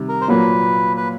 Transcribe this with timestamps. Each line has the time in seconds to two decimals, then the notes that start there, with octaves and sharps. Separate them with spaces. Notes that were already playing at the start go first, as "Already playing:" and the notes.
Already playing: C3 D#3 G3
0.09 A#4
0.21 C5
0.28 A#2 F#3 A#3 B4
0.97 B4